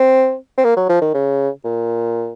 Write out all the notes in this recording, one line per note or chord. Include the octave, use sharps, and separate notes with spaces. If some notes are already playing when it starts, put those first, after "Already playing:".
Already playing: C4
C4
A#3
F#3
F3
D#3
C#3
A#2